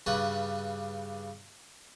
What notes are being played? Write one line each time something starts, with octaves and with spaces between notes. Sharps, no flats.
G2 C#3 D4 B4 C#5 F#5